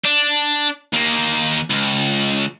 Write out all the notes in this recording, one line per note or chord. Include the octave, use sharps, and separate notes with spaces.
D4
D#2 A#3
C#2